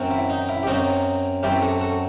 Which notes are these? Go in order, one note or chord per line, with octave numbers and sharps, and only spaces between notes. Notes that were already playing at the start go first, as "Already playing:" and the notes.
Already playing: F#2 F#3 C4
E4
D#4
E4
G4
F#2 F#3 C4 D#4 F#4
F#2 F#3 C4 E4 G4
F#4 A4
F#4 A4